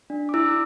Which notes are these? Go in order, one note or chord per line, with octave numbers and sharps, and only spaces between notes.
D4
D6
E4 E6